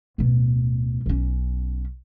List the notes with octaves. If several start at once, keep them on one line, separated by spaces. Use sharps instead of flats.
D1 B2
B1 C#4